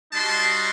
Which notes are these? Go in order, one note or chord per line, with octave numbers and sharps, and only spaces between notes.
G3 D#4 F#4 A5 C6